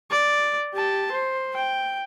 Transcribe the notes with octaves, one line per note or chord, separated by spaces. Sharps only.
D5
G4 A5
C5
G5